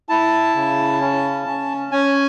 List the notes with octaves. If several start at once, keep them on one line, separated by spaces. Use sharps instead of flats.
E4 A5
C#3
C#4
C#4
C#4 G#5